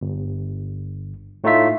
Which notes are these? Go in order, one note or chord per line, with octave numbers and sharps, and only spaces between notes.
G1
A2 A3 D#4 F4 E5 B6